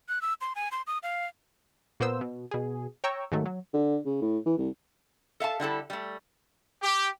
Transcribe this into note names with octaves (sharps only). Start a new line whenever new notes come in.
F#6
E6
C6
G#5
C6
D#6
F5
A#2 A#3 B3 C5 E6
B2
B2 G#4
C#5 G5 A#5 C#6 E6
G#2 D#3 F#3 A3
F#3
D3
C#3
A2
E3
C2
A4 E5 F5 A5
D3 G3 E4 A4
G3 A3
G4